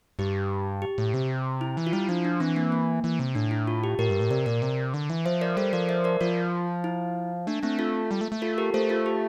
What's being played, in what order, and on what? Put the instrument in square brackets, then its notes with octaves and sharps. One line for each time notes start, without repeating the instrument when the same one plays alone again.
[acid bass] G2 [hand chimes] G4
[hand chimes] G4
[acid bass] A2
C3
[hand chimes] E4
[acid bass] E3
[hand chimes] F4
[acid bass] G3 [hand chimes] E4
[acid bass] F3 [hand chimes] D4
[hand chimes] D4
[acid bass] E3 [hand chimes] C4
[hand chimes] A#3
A#3
[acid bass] E3
C3
[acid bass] A2 [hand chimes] D4
[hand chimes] E4
F4
G4
[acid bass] A2 [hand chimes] G4 A#4
[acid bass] G2
A2
[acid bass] C3 [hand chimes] A#4 D5
[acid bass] A#2 [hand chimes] A#4 D5
[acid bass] C3
D3
E3
[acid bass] F3 [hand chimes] C5 E5
[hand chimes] A#4 D5
[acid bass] G3 [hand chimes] A4 C5
[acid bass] F3 [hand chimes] A#4 D5
[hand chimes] C5 E5
A#4 D5
[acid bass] F3 [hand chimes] F4
[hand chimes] E4
[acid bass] A3 [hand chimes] D4
[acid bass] A3 [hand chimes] C4
[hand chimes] F4 A4
[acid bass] G3
A3
A3
[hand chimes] F4 A4
G4 A#4
[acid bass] A3 [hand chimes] A4 C5
[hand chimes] F4 A4
G4